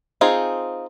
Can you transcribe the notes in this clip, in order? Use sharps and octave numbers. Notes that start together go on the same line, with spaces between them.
C4 D#4 F4 G#4